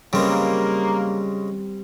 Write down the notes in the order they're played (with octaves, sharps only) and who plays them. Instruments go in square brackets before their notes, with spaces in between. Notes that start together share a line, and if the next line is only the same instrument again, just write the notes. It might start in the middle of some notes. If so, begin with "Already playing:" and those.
[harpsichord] C#3 G#3 [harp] G3 C4 [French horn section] A#3